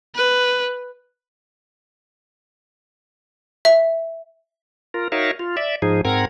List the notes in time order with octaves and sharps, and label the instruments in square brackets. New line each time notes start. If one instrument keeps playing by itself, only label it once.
[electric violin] B4
[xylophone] E5
[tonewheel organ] F4 A#4
D#4 F#4 A#4 C#5 E5 F5
F4
D5 E5
G#2 F3 D#4 G#4
G#2 C4 A#4 F#5 A#5 G#6